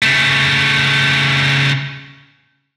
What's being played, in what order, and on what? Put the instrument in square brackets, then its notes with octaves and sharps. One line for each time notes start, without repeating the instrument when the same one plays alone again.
[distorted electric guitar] C#3 A3